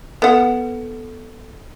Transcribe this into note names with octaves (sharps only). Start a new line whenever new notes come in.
B3 A4 F#5